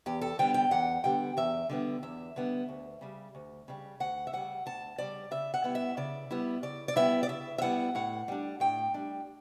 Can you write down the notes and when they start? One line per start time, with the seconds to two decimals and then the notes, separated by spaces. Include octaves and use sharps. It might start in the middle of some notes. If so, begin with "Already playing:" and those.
0.06 E2 G4
0.21 A4
0.39 D3 G3 B3 G5
0.54 G5
0.71 E2 F#5
1.04 D3 G3 B3 G5
1.37 E2 E5
1.70 D3 G3 B3
2.03 E2 E5
2.36 D3 G3 B3
2.69 D2
3.01 C#3 G3
3.35 D2
3.68 C#3 G3
4.00 D2 F#5
4.27 E5
4.33 C#3 G3 F#5
4.66 D2 A5
4.98 C#3 G3 D5
5.31 C#3 E5
5.54 F#5
5.64 G3 B3 E4
5.75 E5
5.97 C#3 D5
6.31 G3 B3 E4
6.63 C#3 D5
6.88 D5
6.96 G3 B3 E4 E5
7.23 D5
7.29 C#3 E5
7.58 E5
7.62 G3 B3 E4 F#5
7.95 A2 F#5
8.28 G3 D4
8.60 A2 G5
8.94 G3 D4